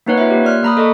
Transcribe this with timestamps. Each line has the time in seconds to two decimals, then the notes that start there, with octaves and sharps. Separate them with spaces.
0.06 A#3 C4 D#4 B4 C#5 F#5
0.18 F4 C#5 E5
0.31 A#3 G4
0.44 D5 C6 F6 F#6
0.63 A#3 A#5 B5 D#6
0.76 A#3 A4 D#5 C#6 D6